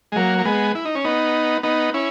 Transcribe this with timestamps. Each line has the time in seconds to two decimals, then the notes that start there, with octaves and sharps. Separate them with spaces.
0.12 G#3
0.16 F#3 A#3
0.39 A#3
0.45 G#3 B3
0.75 E4
0.85 D#4
0.95 C#4
1.04 B3 D#4
1.63 B3 D#4
1.94 C#4 E4